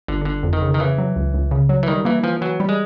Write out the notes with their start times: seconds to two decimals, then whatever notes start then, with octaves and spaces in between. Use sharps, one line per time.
0.08 G1 D3
0.25 G1 D3
0.43 F2
0.53 D#3
0.62 C#3
0.74 D#3
0.80 C#3 E3
0.98 F#3
1.16 C#2
1.34 C#2
1.51 C#3
1.69 F#3
1.83 E3
1.88 D#3 G3
2.05 E3 A#3
2.23 E3 F3
2.41 E3 F#3
2.60 G3
2.69 G#3